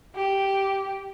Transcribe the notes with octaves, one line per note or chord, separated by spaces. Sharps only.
G4